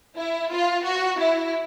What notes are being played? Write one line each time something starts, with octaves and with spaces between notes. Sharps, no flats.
E4
F4
F#4
E4